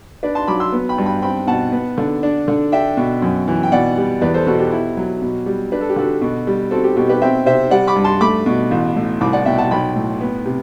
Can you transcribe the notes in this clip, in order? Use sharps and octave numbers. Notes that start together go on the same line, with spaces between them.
D4 B4 D5
A5 C6
F#3 B5 D6
C6 E6
B3
G5 B5
G2
G5 B5
C4 G5 B5
B2 F#5 A5
B3
D3
D4
D3
D4 E5 G5
B2
F#2
E3
G5
B2 D5 F#5
G3
E2 B4 D5
A4 C5
B2 F#4 A4
G4
E4
F#3
B2
G3
D4 B4
A4
G4
D3 F#4 A4
B2
G3
C4 F#4 A4
G4
B2 G4
G4 B4
C4 E5 G5
C3 C5 E5
G3 D5 F#5
B5 D6
G2
A5 C6
A3 B5 D6
B2
A1
A2
C2 B5 D6
D5 F#5
B2 E5 G5
F#5 A5
B1 G5 B5
A2
B3
C3